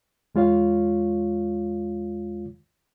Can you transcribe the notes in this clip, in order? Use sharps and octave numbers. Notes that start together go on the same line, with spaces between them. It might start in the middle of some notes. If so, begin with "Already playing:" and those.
E2 G#3 F4 C#5 F5